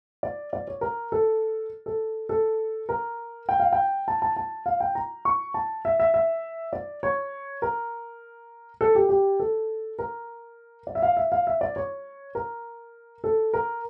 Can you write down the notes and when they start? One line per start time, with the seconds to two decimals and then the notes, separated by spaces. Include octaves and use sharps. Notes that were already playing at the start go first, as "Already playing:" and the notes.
0.23 D5
0.53 D5
0.67 C#5
0.81 A#4
1.12 A4
1.86 A4
2.29 A4
2.89 A#4
3.49 G5
3.60 F5
3.73 G5
4.08 A5
4.22 A5
4.36 A5
4.66 F5
4.80 G5
4.95 A#5
5.25 C#6
5.54 A5
5.85 E5
6.00 E5
6.14 E5
6.73 D5
7.03 C#5
7.62 A#4
8.81 A4
8.95 G4
9.09 G4
9.40 A4
9.99 A#4
10.87 D5
10.95 E5
11.02 F5
11.17 E5
11.32 F5
11.47 E5
11.61 D5
11.76 C#5
12.35 A#4
13.24 A4
13.53 A#4